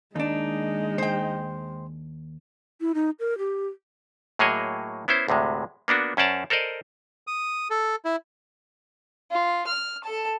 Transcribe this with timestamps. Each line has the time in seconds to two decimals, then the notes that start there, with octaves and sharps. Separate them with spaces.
0.16 D#2 G#3 D4 D#4
0.98 C5 G5
2.81 E4
2.95 D#4
3.20 A#4
3.38 G4
4.39 A2 F#3 A#3 G#4 C#5 D#5
5.08 B3 C#4 E4 C5
5.28 D2 A2 C3 G#3
5.88 A#3 B3 D4 F#4
6.17 F#2 C#4 C5 D5 A5 A#5
6.50 A4 A#4 C5 D5 D#5
7.27 D#6
7.70 A4
8.05 E4
9.31 F4
9.67 F6
10.04 A4 A5